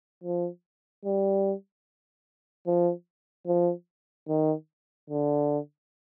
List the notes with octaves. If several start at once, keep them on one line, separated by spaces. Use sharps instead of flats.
F3
G3
F3
F3
D#3
D3